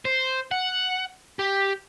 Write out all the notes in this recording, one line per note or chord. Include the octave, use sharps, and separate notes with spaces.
C5
F#5
G4